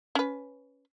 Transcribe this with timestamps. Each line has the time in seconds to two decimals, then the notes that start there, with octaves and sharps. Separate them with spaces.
0.15 C#4 B4